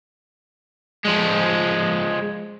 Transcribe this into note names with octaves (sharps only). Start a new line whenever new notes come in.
F3 G#3